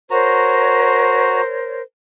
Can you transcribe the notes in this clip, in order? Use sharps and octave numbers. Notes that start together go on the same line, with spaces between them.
F#4 A#4 C5 C#5 A#5